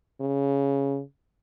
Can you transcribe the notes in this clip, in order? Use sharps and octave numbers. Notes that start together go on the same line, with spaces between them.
C#3